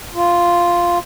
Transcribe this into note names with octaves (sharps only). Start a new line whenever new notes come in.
F4